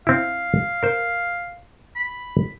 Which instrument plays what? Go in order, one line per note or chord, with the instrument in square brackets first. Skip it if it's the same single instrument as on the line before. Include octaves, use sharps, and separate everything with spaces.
[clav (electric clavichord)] C4 E4 [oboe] F5
[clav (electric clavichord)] A#4 C5
[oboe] B5